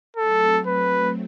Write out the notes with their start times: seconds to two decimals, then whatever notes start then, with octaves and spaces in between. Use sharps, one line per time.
0.16 F#3 A3 C4 A4
0.67 B4